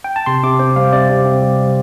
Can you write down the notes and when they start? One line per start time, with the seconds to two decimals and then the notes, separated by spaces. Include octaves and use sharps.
0.04 G5
0.16 A5
0.26 C3 C6
0.43 C3 D6
0.59 C4 C5
0.76 G3 F5
0.92 C3 D5
1.09 C3
1.26 C4
1.42 G3